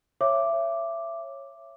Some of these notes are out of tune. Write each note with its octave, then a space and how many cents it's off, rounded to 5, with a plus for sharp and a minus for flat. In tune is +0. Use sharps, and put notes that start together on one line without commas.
C#5 -15 E5 +25 D6 +0